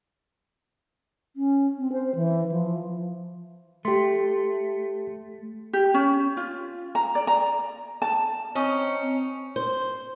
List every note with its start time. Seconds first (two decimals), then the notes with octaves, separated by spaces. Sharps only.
1.36 C#4
1.78 C4
1.92 C5
2.15 E3
2.52 F3
3.85 A3 G4 C6
5.73 G4
5.94 C#4
6.37 F4
6.95 A#5
7.15 D5
7.27 A#5
8.02 A5
8.55 C4 C#4 D#4
9.56 C5